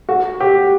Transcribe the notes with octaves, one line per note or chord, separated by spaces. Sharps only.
F#4
G4